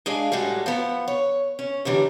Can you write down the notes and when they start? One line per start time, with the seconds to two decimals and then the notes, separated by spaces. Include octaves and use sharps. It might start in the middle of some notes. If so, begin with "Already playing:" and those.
0.06 G#3 D4 G#4 D5 F5
0.32 A2 G3 G#3 F#4 A4
0.66 F3 B3 F#5
1.08 C#5
1.59 C#4
1.85 F#2 D3 E3 G3